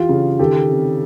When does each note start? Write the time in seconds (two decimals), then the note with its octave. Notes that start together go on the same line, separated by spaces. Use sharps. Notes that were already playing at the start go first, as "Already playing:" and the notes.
Already playing: E3 F4 G4
0.09 C#3
0.39 D#3 G4 A4
0.69 C3